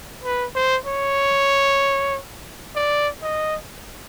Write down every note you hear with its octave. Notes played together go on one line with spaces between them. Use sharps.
B4
C5
C#5
D5
D#5